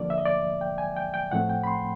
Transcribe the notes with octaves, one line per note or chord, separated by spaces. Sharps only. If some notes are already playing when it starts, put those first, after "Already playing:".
Already playing: D3 F3 A#3 D5
E5
D#5
D5
G5
G#5
G5
G5
A2 F3 A3 C4 F#5
G5
B5
C6